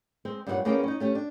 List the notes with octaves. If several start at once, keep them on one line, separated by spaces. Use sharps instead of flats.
G#3 C4
G2 A#2 G3 G4 C#5 F#5
E2 A#3 B3 C#4 G#4 G5
C#4 D#4
A3 C#4 G4
D4